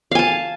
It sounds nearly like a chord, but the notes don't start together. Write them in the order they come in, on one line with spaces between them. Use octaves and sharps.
F5 G#5 A5